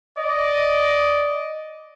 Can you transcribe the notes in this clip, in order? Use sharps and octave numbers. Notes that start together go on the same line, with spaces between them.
D5 D#5